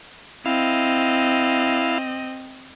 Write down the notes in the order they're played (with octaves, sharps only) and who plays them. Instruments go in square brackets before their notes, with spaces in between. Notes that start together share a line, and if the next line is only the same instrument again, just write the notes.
[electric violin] C4 D#5 [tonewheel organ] E4 F5